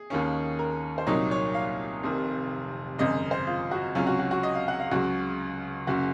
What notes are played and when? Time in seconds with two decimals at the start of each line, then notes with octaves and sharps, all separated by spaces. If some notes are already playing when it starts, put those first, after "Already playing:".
Already playing: G#4
0.10 D#2 D#3 A#3 C#4
0.59 A#4
0.98 C5
1.06 C2 A#2 F#3 A#3 D#4 C#5
1.31 C#5
1.54 F5
2.03 F1 F2 C3 D#3
2.99 G#1 F#2 C#3 D#5
3.31 C5
3.47 F4
3.71 F#4
3.95 C#2 C3 F#3 C#4 F4
4.07 F#4
4.19 F#4
4.31 F#4
4.43 D#5
4.55 F5
4.68 F#5
4.80 F5
4.91 C#2 C#3 F#3 F#4
5.87 F#1 C#3 F#4